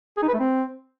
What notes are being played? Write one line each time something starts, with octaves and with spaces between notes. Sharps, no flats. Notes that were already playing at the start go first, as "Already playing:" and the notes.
G#4
D#4
B4
A3
C4